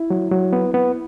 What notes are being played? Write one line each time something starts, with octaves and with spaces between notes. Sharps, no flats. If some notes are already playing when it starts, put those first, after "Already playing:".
Already playing: E4
F#3
F#3
B3
B3